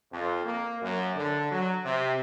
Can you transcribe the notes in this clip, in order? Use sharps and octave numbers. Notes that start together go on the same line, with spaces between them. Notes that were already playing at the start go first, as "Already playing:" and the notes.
F2
A#3
F#2
D3
F#3
C3